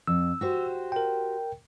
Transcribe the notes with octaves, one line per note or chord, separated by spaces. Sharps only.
F2 E6
F#4 G4 C5
A#4 G5